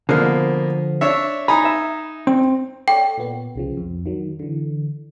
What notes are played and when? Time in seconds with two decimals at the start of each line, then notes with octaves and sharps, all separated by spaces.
0.09 B2 D3 F3 A#3
1.01 D4 C#5 E5
1.48 D#4 G#5 A#5 B5
1.65 E5
2.27 C4
2.88 A4 C#5 D5 G5
3.18 A#2 B3
3.56 C2 C#3 F3
3.77 F2
4.06 D#3 F#3
4.39 D3 E3